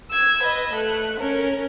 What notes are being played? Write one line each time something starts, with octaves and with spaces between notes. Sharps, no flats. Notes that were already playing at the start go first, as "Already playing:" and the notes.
E6 G#6
B4 D#5
A3 F#6
C#4 A#4